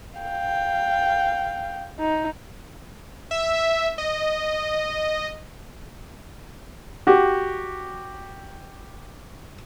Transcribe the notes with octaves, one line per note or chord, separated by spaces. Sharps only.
F5 G5
D#4
E5
D#5
F#4 G4